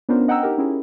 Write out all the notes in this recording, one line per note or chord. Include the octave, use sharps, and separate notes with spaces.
B3 C#4 D4 F4 A#4 C5
D#5 F#5 G5 A#5 E6
D#4 G4 A#4
C#4 E4 G4 G#4 A#4